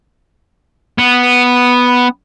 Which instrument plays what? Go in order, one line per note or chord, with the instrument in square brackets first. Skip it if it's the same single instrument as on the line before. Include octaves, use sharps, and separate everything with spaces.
[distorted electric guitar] B3